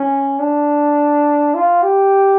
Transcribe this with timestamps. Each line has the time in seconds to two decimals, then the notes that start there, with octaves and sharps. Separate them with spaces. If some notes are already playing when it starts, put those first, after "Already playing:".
Already playing: C#4
0.39 D4
1.54 F4
1.83 G4